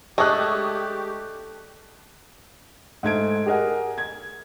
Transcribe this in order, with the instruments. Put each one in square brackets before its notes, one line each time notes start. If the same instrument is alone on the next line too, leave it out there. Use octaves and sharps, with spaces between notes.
[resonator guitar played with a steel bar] G#3 [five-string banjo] A3 D4 [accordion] G4 [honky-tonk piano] C#6 D#6 F#6
[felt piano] G#2 A3 G#6 D7
G4 G#4 A#4 D#5 F#5
G#6